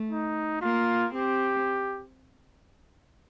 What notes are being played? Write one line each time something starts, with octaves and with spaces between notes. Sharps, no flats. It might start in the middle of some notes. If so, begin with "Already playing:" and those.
Already playing: A3
D#4
A#3 F4
C4 G4